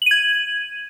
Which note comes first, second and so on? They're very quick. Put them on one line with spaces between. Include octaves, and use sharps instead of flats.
F#7 D#7 G#6